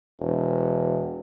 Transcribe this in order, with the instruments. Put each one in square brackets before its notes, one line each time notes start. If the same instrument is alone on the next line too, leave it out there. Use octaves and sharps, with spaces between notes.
[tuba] E1